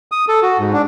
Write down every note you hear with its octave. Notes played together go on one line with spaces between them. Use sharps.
D#6
A4
F#4
G#2
D4